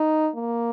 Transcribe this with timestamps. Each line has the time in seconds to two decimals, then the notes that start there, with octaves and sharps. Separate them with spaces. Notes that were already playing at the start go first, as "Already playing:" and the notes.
Already playing: D#4
0.36 A#3